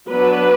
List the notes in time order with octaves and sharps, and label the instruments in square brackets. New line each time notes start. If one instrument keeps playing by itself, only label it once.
[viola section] F#3 B3 D4 B4